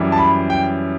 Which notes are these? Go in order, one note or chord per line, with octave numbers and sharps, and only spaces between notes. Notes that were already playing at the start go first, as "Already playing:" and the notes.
Already playing: F#2 E3 G3
A5
B5
G5